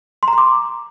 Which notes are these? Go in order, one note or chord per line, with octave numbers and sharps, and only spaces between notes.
C6
A#5
C6
D6